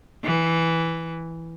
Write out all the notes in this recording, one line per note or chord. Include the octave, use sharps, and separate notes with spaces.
E3